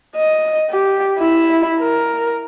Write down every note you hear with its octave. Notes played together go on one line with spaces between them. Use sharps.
D#5
G4
E4
A#4